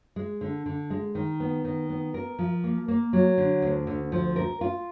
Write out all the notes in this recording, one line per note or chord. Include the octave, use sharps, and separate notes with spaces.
G#3
D3
D3
G#3
D#3
B3
D#3
B3
A#4
F3
A#3
A#3
F#3
D3
D2
D2
F3
A#4
F4